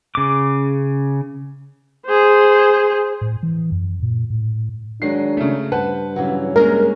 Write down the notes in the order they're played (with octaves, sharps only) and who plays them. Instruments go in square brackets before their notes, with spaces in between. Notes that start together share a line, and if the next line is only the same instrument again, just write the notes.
[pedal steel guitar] C#3 D6
[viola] G#4 C5
[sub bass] A2
E3
F#2
A#2
A2
[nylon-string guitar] D#3 F#3 G#3 [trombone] D4 [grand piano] C7
[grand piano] C#3 A3
[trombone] G2 [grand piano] B4 C5 F#5 [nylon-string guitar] A5
[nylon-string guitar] C#3 E3 F#3
[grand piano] G#3 C#4 [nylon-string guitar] A#3 G#4 D#5 [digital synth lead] A#4